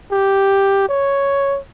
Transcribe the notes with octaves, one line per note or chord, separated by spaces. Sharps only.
G4
C#5